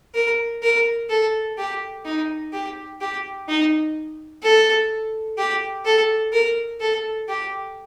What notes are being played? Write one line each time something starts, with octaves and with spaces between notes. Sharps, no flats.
A#4
A#4
A4
G4
D#4
G4
G4
D#4
A4
G4
A4
A#4
A4
G4